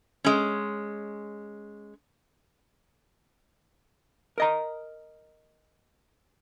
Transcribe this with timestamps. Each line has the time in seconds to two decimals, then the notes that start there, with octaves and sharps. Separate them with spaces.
0.25 G#3 C#4
4.38 A#4 D#5 A#5